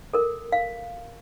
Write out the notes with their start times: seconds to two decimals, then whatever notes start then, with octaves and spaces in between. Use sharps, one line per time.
0.13 A4 A#4
0.52 F5